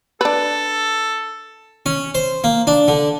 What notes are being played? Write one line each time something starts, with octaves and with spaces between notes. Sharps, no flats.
D4 A4 B4
C#4
C5
A#3
D4
D3